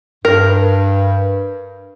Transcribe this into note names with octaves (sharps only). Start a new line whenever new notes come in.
G2 A#4